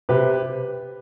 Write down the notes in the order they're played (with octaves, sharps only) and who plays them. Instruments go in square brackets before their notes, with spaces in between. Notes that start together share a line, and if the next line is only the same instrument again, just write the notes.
[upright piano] C3 G4 B4